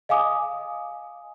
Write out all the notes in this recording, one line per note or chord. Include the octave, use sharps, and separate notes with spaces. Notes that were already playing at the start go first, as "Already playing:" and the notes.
D#5 F5 G#5 D6 D#6